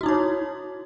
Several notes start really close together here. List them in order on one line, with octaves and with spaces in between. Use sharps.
F#4 E4 D#4 C#5